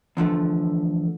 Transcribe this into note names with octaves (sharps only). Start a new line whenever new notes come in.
E2 D3 F3 A3